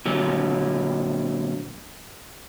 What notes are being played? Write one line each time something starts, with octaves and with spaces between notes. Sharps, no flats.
A#2 D3 F#3